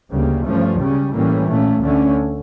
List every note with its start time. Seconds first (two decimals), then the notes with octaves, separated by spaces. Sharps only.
0.11 D2 C#3 G3 A#3
0.44 G2 F3 A3 C#4
0.79 C#2 C#3 G3 C#4
1.13 A2 E3 G3 A#3 C#4
1.48 A#2 A3 C#4
1.81 D2 D3 A3 C#4